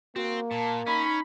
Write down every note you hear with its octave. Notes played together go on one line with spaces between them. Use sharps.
A#3 C4 F#4
A#2 A5
C#4 D#4 B5